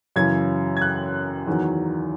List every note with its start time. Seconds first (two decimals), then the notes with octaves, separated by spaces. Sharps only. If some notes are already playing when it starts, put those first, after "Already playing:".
0.16 F#2 C#3 E3 G#6
0.77 G#6
0.82 F#6
1.47 E2 D#3 F#3